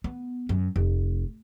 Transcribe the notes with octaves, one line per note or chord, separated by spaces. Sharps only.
B3
F#2
F1